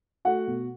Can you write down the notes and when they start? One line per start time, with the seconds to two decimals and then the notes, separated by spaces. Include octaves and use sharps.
0.25 A3 F#4 F#5
0.47 B2